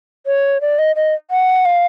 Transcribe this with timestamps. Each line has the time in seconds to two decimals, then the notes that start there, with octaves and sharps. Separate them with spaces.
0.26 C#5
0.61 D5
0.79 D#5
0.96 D#5
1.31 F#5
1.65 F5